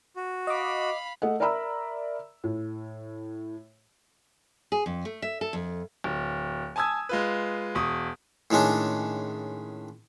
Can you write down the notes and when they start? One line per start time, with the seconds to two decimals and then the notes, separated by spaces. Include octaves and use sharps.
0.16 F#4
0.47 D#5 F5 B5 D6
1.22 A3 D#5 F#5
1.40 A#4 D5 E5 A#5 B5 E6
2.44 A2
4.72 G#4
4.86 F2
5.05 A3
5.22 E5
5.41 A4
5.53 F2
6.04 D1
6.76 G#5 A5 D#6 E6 G#6
7.09 G#3 F4 B4
7.75 E1 C#6 D#6
8.51 A2 D#3 G#3 C#4 D4